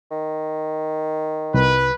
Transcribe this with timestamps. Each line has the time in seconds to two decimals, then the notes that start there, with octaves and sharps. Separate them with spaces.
0.11 D#3
1.54 C2 B4